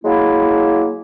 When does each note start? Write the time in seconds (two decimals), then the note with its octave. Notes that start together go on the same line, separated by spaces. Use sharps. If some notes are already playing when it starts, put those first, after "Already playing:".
0.04 F#3 G#3 A#3 E4